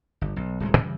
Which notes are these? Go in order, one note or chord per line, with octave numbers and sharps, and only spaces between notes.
G1
B1
D1 C2 G#3
F#2 C#3 E3 G3